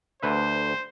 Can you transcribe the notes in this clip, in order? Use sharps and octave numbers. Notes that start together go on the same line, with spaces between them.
D2 B4 C5 E5